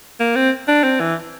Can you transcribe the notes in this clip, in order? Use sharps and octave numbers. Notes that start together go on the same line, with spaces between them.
A#3
C4
D4
C4
E3